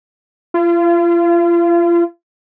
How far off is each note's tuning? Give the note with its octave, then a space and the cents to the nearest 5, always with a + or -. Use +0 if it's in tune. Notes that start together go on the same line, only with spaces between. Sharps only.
F4 -35